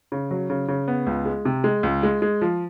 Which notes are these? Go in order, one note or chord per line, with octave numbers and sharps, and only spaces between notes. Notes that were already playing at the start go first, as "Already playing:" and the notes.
C#3
F#3
C#3
C#3
B3
C#2
G#3
C3
G#3
C#2
G#3
G#3
F3